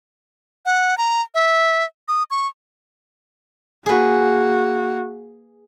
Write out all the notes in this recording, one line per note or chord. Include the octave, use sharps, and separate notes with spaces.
F#5
A#5
E5
D#6
C#6
A#3 F#4 G#4 B4